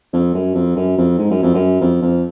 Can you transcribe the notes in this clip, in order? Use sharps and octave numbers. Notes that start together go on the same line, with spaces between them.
F2
F#2
F2
F#2
F2
G#2
F#2
F2
F#2
F2
F2